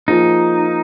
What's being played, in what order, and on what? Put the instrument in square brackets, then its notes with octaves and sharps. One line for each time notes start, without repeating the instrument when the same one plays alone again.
[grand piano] F3 A#3 F4 G#4 [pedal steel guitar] D#4